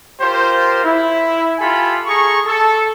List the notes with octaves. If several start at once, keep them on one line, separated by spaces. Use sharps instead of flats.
F4 G4 A#4 C5
E4
F4 G4 A4 G#5 B5
G#4 A4 A#5 C#6
A4